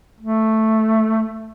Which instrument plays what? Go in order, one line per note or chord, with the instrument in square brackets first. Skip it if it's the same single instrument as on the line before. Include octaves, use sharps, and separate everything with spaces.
[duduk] A3